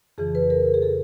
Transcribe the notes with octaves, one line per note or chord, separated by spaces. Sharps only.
F2 C#3 E3 G#4
B4
A#4
G#4
A4